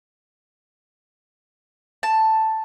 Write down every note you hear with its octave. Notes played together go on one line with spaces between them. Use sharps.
A5